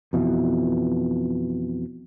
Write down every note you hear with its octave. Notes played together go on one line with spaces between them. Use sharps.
F2 B2 E3